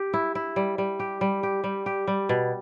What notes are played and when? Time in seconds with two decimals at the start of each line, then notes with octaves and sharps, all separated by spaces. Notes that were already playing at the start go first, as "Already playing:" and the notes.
Already playing: G4
0.13 E4
0.35 E4
0.56 G3
0.78 G3
1.00 G4
1.21 G3
1.43 G4
1.64 G3
1.86 G4
2.07 G3
2.29 B2